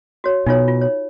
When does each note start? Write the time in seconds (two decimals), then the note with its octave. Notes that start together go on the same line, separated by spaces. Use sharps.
0.24 F#4 C#5
0.46 B2 D#4 F4 C#5
0.68 F4
0.81 C#5